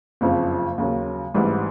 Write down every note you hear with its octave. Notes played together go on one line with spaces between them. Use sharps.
F#1 F2 C#3 F3
D#2 C#3 F#3
A1 G#2 E3 G3